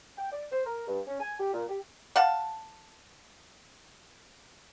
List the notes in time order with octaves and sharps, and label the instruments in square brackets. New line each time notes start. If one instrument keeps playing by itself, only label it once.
[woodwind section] G5
D5
C5
A#4
G2
C#4
G#5
G4
A#2
G4
[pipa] F5 F#5 A5